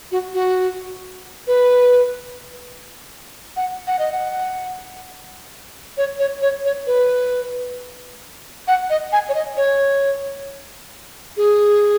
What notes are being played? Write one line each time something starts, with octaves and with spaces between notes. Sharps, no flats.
F#4
F#4
B4
F#5
F#5
D#5
F#5
C#5
C#5
C#5
C#5
B4
F#5
D#5
G#5
C#5
D#5
C#5
G#4